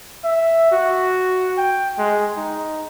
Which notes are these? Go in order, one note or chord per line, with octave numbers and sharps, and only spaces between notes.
E5
F#4
G5
G#3
D#4